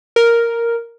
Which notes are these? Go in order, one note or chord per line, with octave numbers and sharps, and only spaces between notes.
A#4